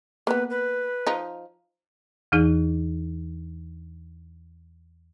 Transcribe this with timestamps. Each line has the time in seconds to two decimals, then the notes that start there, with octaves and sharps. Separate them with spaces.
0.27 A#3 B3 B4
0.50 B4
1.07 F3 D#4
2.32 E2 E3 D#4 G#4